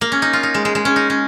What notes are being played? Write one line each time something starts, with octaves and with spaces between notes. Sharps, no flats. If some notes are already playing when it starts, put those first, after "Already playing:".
A#3
C#4
D#4
F4
D#4
G#3
G#3
G#3
C#4
D#4
C#4